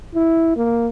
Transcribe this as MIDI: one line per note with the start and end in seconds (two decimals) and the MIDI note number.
0.15 0.55 64
0.57 0.88 58